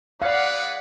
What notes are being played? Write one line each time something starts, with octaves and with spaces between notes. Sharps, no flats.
G#3 B4 D5 F5 F#5